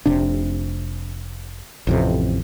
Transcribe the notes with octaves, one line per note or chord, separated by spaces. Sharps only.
F1 C3 D4
A1 F2 C3